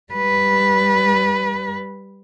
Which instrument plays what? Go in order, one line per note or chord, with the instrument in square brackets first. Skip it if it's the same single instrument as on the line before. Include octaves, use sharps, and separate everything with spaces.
[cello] G3 B4